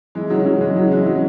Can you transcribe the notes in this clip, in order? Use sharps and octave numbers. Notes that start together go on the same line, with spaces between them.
E3 G#3
C#3 F#3
C#3 F#3
E3 G#3
C#3 F#3
E3 G#3
C#3 F#3